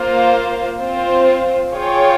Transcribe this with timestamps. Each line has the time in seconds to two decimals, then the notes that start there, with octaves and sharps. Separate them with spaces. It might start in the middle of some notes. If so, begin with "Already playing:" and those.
Already playing: A#3 F4 C5 F5
0.81 C4 F4 C5
1.73 F4 G#4 C#5 G5